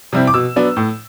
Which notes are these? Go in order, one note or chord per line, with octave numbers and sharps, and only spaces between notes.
C3 G3 C4 E4
D6
B2 E6
F#3 B3 D4
A2